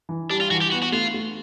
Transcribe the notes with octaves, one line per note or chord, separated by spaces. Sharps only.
E3
G3 D4
F4
E3 F#4
G4
B3 F#4
F#4
A3 F4
A3